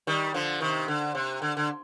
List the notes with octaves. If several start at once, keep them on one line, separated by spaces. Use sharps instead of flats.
D#3 G3
D3 F3
C3 D#3
D3
C3
D3
D3